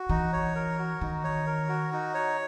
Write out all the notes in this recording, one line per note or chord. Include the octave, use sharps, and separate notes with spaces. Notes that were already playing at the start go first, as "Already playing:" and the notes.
Already playing: F#4
E3 D#4
C#5
A#4
F#4
D#3 D#4
C#5
A#4
F#4
D#4
C#5